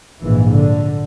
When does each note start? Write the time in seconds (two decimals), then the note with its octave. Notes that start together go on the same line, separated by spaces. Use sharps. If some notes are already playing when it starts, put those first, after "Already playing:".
0.22 A#1 G#2 E3
0.52 D3